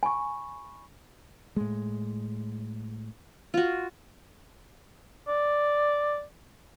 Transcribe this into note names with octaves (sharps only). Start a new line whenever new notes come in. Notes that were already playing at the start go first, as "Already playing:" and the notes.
G#5 B5 C#6
A2 G#3
F4 F#4
D5